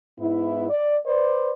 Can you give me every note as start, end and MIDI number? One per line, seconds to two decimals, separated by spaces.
0.19 0.67 44
0.19 0.67 59
0.19 0.67 64
0.69 0.98 74
1.06 1.51 71
1.06 1.51 72
1.06 1.51 74